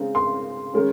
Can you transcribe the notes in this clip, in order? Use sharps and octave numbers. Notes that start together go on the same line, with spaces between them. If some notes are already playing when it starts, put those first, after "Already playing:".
Already playing: C#3 G#3 C4 D#4
C6
D#3 G#3 C#4